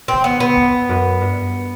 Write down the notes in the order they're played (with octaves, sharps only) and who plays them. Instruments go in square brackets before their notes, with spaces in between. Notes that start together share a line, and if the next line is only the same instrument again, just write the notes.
[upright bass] E3 [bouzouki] C4
[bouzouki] B3
[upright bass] D3
[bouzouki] B3
[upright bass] E2
F#2
G2